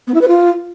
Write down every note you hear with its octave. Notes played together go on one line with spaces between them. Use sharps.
B3
E4
B4
F4